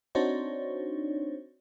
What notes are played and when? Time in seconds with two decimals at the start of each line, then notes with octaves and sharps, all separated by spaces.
0.15 C4 D4 D#4 F#4 C5 C#5